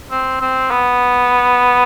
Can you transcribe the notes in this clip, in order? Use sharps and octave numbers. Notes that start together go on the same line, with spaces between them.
C4
C4
B3